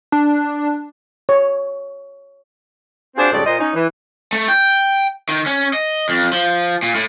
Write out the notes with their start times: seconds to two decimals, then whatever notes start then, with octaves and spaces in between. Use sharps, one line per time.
0.12 D4
1.29 C#5
3.16 C4 D4 F4 F#4 G#4 C5
3.32 F2 G#2 C#3 G3 A4 D5
3.45 A#2 C5 D#5
3.58 C#4 D#4
3.74 E3
4.33 A3
4.48 G5
5.29 D#3
5.46 C#4
5.74 D#5
6.09 F2
6.33 F3
6.83 A#2
6.95 A2